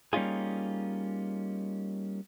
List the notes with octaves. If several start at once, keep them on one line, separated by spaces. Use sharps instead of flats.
G3 A#3 C#4 D#4 F4 G#4